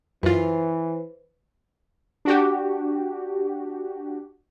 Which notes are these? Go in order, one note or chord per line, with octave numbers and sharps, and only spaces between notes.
F#2 E3 F4 B4 C5
D4 F#4 G4